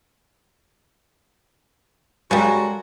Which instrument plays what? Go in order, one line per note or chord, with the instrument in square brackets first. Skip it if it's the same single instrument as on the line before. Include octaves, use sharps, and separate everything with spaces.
[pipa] C#3 G3 [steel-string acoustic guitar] G#3 A4 A#4 [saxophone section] F#4